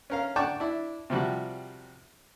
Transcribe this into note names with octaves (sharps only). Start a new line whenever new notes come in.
C#4 A#4 F5
D5 F#5 G5 A5 C#6 D6
D4 E4
C3 F3 G3 F#4